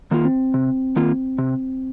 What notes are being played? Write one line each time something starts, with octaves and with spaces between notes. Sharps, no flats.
D#3 A#3 F4
C4
C3
D#3 A#3 F4
C3